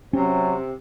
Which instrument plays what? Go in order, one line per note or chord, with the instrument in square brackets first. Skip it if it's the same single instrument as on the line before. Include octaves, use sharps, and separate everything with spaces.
[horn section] C3 [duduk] F#3 [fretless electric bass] C#4